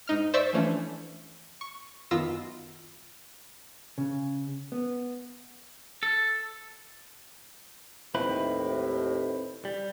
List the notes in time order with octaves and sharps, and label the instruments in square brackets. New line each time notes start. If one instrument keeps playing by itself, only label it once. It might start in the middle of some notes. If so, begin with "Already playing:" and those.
[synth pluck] G#2 D#4 F6
C5 D5 E5 C#6 E6
E3 F3 A3 C#4 D4
C#6
F#2 D#3 B3 F4 E6 A#6
[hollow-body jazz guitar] C#3
B3
[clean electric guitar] A4
[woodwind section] D#2 A2 [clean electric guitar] C4 E4 B4
[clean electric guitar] G3